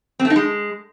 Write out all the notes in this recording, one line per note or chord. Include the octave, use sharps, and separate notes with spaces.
C4
A3
D#4
G#3